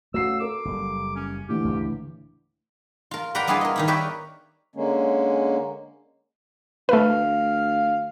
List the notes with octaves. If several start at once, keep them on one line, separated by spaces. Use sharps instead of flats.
A3 C#4 F#4 F5 E6 C7
A4 A#4 D6
F#1 G3
C#4
A2 D3 E3 G4
C#2 G2
F4 A#4
A#4 B4 D5 F#5 G5 A#5
G3 B3 D4 E4 F4 G#4
A#4 D#5
D#3 D#4 E4
G4 A#4 B4 C#5 D5 E5
D3 G#3 A#3 C#4
D2 A3 B4 F5